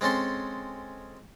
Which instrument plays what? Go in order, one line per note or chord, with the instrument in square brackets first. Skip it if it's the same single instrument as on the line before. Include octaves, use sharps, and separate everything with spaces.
[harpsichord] G#3 C4 C#4 A4 C6